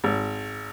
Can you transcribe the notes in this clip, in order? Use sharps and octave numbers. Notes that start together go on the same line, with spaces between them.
G#1